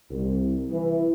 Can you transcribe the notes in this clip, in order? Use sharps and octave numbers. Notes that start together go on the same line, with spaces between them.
C2
E3